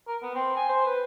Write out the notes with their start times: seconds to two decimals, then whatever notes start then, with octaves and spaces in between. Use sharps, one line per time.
0.08 A#4
0.22 B3
0.35 C4
0.56 G#5
0.69 C5
0.86 B4